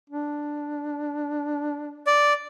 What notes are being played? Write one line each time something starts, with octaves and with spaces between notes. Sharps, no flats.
D4
D5